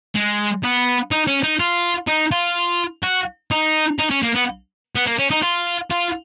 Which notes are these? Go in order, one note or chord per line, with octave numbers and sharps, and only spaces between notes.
G#3
B3
D#4
C#4
D#4
F4
D#4
F4
F#4
D#4
D#4
C#4
A#3
B3
B3
A#3
C#4
D#4
F4
F4